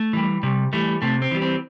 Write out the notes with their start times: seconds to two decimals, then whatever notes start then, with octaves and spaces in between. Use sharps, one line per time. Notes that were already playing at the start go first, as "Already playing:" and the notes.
Already playing: A3
0.13 E3 G3
0.43 C3 G3
0.73 E3 G3 A3
1.02 C3 A3
1.22 C4
1.31 E3 G3
1.42 C4